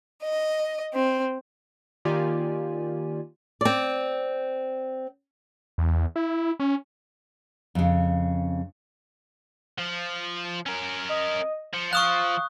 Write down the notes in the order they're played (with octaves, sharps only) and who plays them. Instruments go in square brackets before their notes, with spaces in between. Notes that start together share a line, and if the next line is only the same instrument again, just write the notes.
[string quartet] D#5
C4
[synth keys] D#3 A#3 F4 G4 D5 G#5
[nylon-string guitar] C4 D5
[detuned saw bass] E2
E4
C#4
[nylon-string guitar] F2 C#3
[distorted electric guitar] F3
C#4 A#4
[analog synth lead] D#5
[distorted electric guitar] F3 [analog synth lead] C#7
[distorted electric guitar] F3 [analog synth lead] F5 [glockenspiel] C#6 D#6 F#6